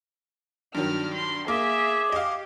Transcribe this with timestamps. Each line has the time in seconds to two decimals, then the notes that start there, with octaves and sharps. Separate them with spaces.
0.75 G2 D#3 F#3 F6
1.15 C6
1.48 A#3 G#4 E5 D6
2.12 G4 D#5 F5